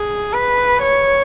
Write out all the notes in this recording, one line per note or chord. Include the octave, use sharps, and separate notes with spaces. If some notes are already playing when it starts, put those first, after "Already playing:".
Already playing: G#4
B4
C#5